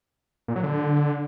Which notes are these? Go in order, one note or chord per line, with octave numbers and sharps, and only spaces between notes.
A#2
F#3
D3